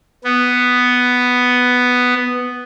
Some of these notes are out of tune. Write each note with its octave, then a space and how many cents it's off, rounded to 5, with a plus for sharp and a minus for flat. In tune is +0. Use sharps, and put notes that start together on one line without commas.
B3 +5